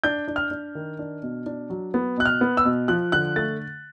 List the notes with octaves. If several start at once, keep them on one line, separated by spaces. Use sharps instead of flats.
D4 G6
D4
F6
D4
D#3
D4
B2
D4
F#3
B3
B2 F#6
F6
B3
E6
B2
F3 F#6
D3 F#6
A3 A6